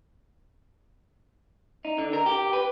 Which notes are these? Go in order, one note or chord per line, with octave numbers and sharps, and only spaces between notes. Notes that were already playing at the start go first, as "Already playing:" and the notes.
D#4
D3
A#4
G4
B4